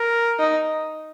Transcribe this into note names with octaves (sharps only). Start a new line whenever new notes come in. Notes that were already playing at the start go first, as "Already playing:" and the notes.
Already playing: A#4
D#4